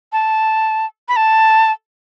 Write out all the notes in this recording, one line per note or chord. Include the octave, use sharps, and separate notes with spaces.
A5
B5
A5